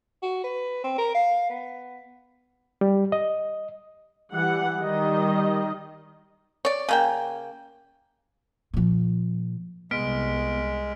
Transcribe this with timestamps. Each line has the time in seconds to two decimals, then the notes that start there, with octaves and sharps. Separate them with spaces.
0.22 F#4
0.44 B4
0.84 C4
0.98 A#4
1.15 F5
1.50 B3
2.81 G3
3.12 D#5
4.33 E3 G3 F#5
4.79 D#3 G3 D#5
6.65 C#5 D5
6.89 C#3 A#3 G5
8.74 A#2 F3
9.91 C2 G#3 B3 F6 B6 D7